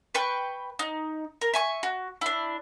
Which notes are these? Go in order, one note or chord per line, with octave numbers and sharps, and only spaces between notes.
B4 G5 C#6
D#4
A#4
E5 G#5 C#6
F#4
D4 E4